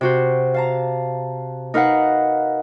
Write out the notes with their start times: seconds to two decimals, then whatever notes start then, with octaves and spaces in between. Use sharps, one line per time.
0.01 C3 F#4 C5
0.54 F5 A5 A#5
1.74 D#4 A#4 B4 F5 F#5